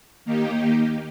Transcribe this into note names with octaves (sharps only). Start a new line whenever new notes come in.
D#2 D#3 A#3 D#4 G4